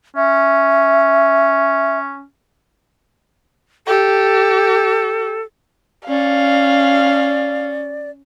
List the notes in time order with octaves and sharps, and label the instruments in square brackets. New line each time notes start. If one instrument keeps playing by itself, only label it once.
[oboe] C#4 [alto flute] E5
[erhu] G4 [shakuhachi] A4
[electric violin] C#4 [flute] D5 [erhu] F5